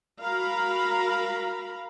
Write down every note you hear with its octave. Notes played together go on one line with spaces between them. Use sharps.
F#4 A#4 F5 A#5 B5